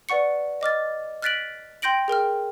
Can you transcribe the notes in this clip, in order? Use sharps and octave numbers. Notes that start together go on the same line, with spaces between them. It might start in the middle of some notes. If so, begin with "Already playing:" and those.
B4 D5 F#5 C#6 C#7
D#5 D6 F6 A6
F6 F#6 A6 B6 D7 F#7
G5 C6 G6 A#6 D7 F#7
G#4 A#4 G5 F6